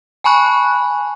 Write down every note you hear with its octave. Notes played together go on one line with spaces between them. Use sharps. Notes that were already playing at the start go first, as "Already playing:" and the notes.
G#5 A5 B5 C#6 F#6